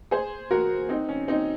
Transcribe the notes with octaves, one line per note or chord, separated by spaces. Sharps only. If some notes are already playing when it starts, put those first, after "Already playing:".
G#4 C5
F#4 A#4
C4 D#4
C#4
C4 D#4